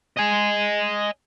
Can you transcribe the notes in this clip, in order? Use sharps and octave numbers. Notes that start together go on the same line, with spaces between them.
D#5 G#5